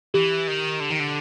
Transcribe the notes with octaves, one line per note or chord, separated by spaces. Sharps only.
E3 G4
D#3
D3
D#3
D3